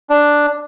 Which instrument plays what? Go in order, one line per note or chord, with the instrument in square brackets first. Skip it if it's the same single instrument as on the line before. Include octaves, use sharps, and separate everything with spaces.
[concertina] D4